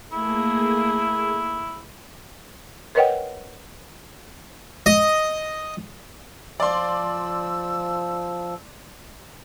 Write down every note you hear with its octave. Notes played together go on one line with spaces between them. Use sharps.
A3 A#3 E4 G#4
A#4 B4 C#5 D#5 F#5 G5
D#5
F3 D5 C6 E6